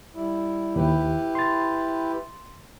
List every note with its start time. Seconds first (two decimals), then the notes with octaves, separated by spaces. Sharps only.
0.14 G3 E4
0.76 D#2 E4 G4 B4
1.35 C6 A6